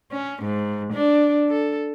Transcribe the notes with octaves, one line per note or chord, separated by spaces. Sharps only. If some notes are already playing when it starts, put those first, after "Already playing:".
C#4
G#2
D4
A4